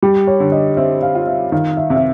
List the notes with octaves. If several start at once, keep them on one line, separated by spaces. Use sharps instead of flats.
G3 G4
C#5
D3
D#5
C4 E5
F5
F4
E5
D#3 F5
E5
C3
E5